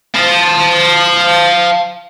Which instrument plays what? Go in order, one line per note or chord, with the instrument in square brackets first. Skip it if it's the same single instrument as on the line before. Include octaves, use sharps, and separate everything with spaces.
[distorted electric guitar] F5 A5